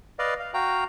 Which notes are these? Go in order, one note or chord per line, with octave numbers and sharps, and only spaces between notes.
B4 D5 D#5 F5
F5
F#4 F5 G5 A#5